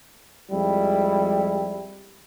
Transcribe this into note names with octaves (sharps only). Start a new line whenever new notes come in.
F2 F3 G3 G#3 E4